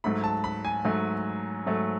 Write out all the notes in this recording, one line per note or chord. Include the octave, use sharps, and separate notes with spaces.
G#2 F#3 A3 B5
A5
B5
G#5
G#2 F#3 A3
G#2 F#3 A3